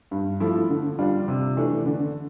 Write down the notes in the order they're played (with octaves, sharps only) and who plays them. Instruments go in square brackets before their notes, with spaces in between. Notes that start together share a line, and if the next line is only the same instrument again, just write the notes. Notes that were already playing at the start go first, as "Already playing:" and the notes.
[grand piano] G2
F3 A3 E4
D3
G3 D4 F4
C3
E3 A3 D4
D3